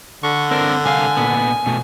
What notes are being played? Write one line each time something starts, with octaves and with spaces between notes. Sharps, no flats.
D3 C#6
C4 D4 A#4
C2 F5 G#5
A#2 B3
B2 A3